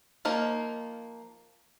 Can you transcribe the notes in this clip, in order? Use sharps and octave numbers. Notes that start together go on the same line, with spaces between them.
F3 A#3 D#4